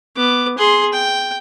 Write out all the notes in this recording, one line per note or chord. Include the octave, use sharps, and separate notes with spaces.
B3 D6
G#4 C6
G5